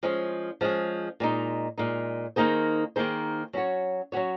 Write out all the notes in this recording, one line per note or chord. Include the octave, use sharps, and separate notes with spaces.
F3 G#3 C#4 G#4
F3 G#3 C#4 G#4
A#2 G#3 D#4
A#2 G#3 D#4
D#3 A#3 D#4 G#4 C5
D#3 A#3 D#4 G#4 C5
F#3 C#4 F#4 C#5
F#3 C#4 F#4 C#5